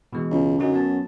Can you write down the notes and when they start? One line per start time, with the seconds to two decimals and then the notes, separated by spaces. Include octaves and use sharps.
0.13 B2 E3 G#3
0.30 C#2
0.59 F#2 D3 F#3 D#4
0.72 F#3 B3 A5